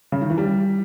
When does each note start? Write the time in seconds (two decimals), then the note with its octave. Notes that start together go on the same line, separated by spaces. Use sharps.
0.12 C#3
0.22 D#3
0.30 E3
0.38 G3